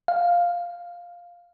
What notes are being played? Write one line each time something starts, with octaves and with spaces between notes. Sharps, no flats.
F5